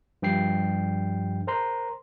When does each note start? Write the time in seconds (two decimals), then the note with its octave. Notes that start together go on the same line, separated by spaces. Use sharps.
0.22 G2 F3 G5 C7
1.47 A#4 C5 A#5 C6